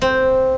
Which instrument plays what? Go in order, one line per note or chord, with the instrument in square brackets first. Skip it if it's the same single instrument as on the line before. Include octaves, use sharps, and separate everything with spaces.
[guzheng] C4